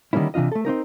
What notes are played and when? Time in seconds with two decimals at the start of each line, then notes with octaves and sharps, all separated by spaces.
0.13 D3 D#3 G3 A#3 C#4 E4
0.34 C3 E3 D4 F4 D#5
0.52 A3 A4
0.65 C4 C#4 D#4 A#4